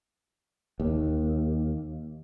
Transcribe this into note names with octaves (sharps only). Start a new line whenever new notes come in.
D#2